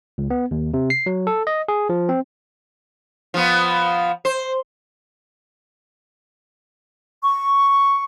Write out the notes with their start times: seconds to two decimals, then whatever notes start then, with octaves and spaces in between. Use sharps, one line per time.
0.18 C#2
0.30 B3
0.51 D#2
0.74 C3
0.90 C7
1.06 F#3
1.27 A4
1.47 D#5
1.68 G#4
1.89 F3
2.09 C4
3.34 F3 B3
4.25 C5
7.23 C#6